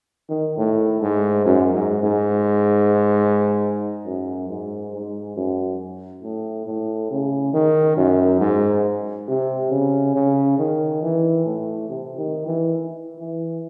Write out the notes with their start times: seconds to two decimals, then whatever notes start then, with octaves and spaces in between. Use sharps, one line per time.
0.29 D#3
0.58 A2
1.02 G#2
1.45 F#2
1.74 G#2
2.03 G#2
4.06 F#2
4.49 G#2
4.93 G#2
5.36 F#2
6.23 A2
6.67 A2
7.11 C#3
7.54 D#3
7.97 F#2
8.40 G#2
9.28 C3
9.71 C#3
10.15 C#3
10.58 D#3
11.02 E3
11.45 A2
11.89 C3
12.17 D#3
12.46 E3
13.19 E3